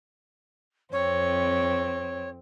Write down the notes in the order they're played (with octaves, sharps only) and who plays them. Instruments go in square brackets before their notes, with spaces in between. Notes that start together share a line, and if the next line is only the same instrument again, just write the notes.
[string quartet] F2 C4 [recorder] C#5